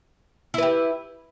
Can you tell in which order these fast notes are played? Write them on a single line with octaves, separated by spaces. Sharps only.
E4 B4 G4